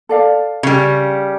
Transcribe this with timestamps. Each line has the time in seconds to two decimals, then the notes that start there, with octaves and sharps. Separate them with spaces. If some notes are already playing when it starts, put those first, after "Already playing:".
0.09 A4 D5 F5
0.63 C#3 G3